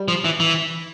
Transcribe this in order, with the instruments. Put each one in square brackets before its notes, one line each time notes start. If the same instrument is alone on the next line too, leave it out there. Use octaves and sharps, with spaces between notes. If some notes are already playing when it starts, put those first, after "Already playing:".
Already playing: [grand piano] G3
[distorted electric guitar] F3
E3
E3